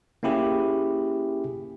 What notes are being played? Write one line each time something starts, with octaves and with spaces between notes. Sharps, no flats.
A#3 C#4 E4 G4 G#4